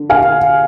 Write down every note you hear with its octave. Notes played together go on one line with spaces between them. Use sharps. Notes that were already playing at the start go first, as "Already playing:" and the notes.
Already playing: D3
F5 G#5